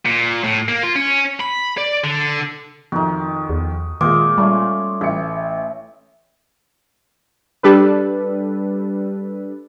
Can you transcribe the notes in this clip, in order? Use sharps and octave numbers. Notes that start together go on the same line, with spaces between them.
A#2
A2
A#3
F4
C#4
B5
D5
D3
F2 D#3 D#4 F#4
E2
A#2 D#3 G#3 F4 D#5 D6
G3 A3 C#4
A1 E5 C#7
G3 D4 A4 B4